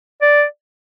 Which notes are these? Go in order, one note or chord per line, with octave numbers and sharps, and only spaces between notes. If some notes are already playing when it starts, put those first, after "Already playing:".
D5